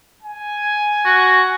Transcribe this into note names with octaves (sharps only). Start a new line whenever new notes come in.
G#5
F#4